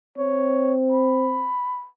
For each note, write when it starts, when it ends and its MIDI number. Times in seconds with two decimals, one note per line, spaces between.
0.18 1.53 60
0.18 0.74 73
0.92 1.88 83